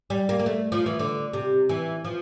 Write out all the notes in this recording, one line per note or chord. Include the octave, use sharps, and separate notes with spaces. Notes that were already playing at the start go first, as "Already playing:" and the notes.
G3
A#3
A#3
A3
F3
E3
D3
C3
E3
F3